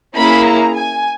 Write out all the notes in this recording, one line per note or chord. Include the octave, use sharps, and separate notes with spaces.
A#3 C#4 E4 G#4 B5
A#5
G#5